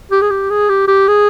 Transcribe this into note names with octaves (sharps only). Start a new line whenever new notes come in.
G4
G#4
G4
G#4
G4
G4
G#4